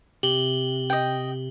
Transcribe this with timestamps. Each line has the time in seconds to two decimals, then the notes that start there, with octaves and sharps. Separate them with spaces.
0.23 C3 G4 F#7 G7
0.90 D#5 G5